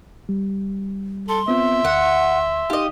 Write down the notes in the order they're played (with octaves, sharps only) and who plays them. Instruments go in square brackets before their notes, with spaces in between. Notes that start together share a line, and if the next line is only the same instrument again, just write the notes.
[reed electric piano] G3
[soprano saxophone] A4 [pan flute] C6
[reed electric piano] B3 C4 F4 [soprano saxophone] E5
[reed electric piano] D2 [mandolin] F#5
[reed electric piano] D#4 F5 [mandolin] G4 D#5